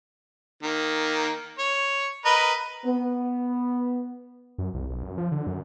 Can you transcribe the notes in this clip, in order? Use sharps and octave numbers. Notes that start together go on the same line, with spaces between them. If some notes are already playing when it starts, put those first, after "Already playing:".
D#3 A#3
C#5
A#4 B4 D#5
B3
F#2
C2
B1
F#2
F3
D3
F#2